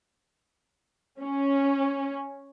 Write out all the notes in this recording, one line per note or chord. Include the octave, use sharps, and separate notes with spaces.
C#4